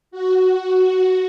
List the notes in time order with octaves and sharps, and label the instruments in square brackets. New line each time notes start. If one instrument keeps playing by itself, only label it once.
[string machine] F#4